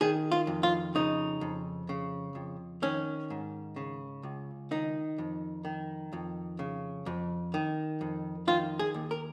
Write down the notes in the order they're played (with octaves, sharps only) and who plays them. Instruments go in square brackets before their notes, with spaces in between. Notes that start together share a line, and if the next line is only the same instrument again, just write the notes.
[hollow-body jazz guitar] D#3 G#4
F4
F2
F4
C#3 D#4
F2
C#3
F2
D#3 C#4
G#2
C#3
C#2
D#3 D#4
F2
D#3
F2
C#3
F2
D#3
F2
D#3 F4
G#4
D#2
A#4